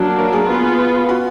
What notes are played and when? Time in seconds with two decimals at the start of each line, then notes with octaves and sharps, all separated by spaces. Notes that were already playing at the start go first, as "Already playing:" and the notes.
Already playing: F#3 A#3 D4 F#4
0.18 A#4
0.33 G#4
0.48 B3 F4 B4
1.09 F#4